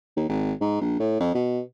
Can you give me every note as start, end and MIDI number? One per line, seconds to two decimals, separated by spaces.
0.16 0.28 39
0.29 0.53 32
0.61 0.78 44
0.81 0.99 34
0.99 1.19 45
1.20 1.34 41
1.35 1.61 47